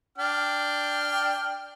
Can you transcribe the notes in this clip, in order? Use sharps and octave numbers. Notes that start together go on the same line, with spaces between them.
D4 G5 F6